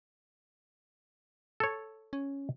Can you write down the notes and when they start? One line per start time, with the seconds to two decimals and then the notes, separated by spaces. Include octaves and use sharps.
1.60 A4 C#5
2.13 C#4